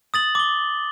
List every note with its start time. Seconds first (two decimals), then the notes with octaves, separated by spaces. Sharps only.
0.14 D#6 A6 F#7
0.35 D6 G7